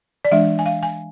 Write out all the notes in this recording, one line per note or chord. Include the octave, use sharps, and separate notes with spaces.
D5
E3 G#3 D4 E5
G#5
F5
G#5